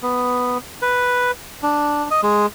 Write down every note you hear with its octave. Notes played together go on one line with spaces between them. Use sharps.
B3
B4
D4
D#5
G#3